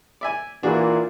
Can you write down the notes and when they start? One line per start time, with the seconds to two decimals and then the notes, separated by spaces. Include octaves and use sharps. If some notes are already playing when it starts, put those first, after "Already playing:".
0.21 D5 E5 G#5
0.63 A#2 E3 D4 F#4 G#4